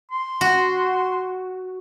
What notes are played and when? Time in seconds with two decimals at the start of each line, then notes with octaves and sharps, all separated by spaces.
0.12 C6
0.41 F#4